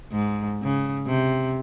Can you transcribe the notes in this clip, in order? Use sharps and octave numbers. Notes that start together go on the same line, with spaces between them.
G#2
C#3
C3